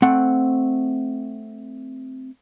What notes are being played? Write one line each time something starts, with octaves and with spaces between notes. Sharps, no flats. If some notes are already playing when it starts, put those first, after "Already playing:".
A3 C4 F#5